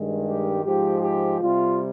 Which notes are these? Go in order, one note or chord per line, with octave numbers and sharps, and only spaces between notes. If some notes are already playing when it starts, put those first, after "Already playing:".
Already playing: G2 D#3 G#3
G4
G#2 F3 G#3 G4
G4
C3 G3 F4